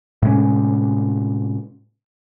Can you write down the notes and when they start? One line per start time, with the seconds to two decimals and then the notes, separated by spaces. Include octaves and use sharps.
0.22 A2 C3 G#3 C#4